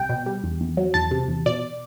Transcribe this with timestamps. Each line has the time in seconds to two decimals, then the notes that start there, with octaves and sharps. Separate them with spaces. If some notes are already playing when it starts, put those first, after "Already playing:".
Already playing: C2 G3 G5
0.09 B2
0.26 G3
0.44 E2
0.61 E2
0.77 F#3
0.94 E2 A5
1.11 C3
1.28 E2
1.46 B2 D5